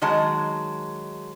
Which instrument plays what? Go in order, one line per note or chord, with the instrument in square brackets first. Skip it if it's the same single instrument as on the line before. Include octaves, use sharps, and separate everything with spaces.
[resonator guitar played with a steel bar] D#3 F#3 G#3 A5